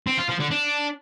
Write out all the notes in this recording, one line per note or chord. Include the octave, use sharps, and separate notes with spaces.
C4
F4
F3
D3
D4